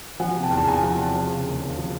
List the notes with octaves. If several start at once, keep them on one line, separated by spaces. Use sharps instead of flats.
F3 F#5 G#5
C3
G5 A5
E2
A5
E2 G#5 A#5
F3
C3
F3
C#3
D#2
D#2
F3